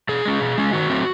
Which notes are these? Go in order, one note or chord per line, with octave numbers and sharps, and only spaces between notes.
B2 G#4
G#3 C#4
B2
G#3 C#4
D#3 F#4
F#3 A3 C4